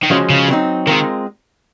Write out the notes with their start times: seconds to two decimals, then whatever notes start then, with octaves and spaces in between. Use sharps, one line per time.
0.03 D#3
0.10 C#3 F3 G#3 C#4 F#4 C5
0.30 C#3
0.48 F#3 C4 D#4
0.87 D#3 G#3 C4 F4 A#4